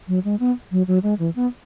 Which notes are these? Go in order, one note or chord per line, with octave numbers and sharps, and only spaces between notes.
F#3
G#3
B3
F#3
F#3
G#3
E3
B3